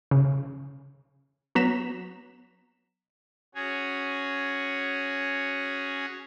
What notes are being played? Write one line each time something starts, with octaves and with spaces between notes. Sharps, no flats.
C#3
F#3 B3 A#5 B6 E7
C#4 F#4 G#4 C#5